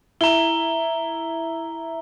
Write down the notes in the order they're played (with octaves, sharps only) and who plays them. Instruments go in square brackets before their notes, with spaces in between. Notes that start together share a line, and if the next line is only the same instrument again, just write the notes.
[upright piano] E4 [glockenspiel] A#5 G7